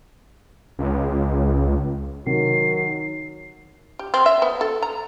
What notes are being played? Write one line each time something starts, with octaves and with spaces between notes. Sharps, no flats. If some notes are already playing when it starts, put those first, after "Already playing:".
C#2
C3 D#3 F#3 C7
G4
C4
E5
B3
A4
A#5